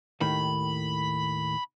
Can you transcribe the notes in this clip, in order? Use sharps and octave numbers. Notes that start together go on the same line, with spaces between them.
D#2 A2 D#3 B5